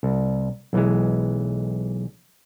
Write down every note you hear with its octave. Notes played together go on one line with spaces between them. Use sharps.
C2
B1 E3 G#3